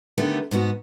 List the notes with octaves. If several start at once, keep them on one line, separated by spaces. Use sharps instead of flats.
D3 D#3 A3 B3 C#4 G4
G#2 B2 B3 F#4